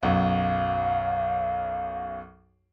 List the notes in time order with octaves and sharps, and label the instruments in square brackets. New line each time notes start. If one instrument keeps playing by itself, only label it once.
[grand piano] B1 F#2 [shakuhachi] F5